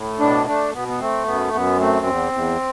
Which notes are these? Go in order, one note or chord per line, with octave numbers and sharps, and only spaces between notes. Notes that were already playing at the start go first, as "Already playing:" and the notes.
Already playing: A2
B2 D4
A3 D4
B2 B3
B3
A3 C4
F#2 B3
F#2 B3
A3 C4
E2
E2